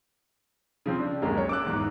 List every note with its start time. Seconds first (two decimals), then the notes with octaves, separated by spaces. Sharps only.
0.86 C#3 F3 C4
0.99 D4
1.22 D1 F#2 G#3 A#3
1.38 C#5
1.49 D6 E6 F#6
1.66 E2 G#2